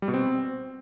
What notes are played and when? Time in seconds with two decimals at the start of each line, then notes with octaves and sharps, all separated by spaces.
0.02 G3
0.08 B2
0.14 C4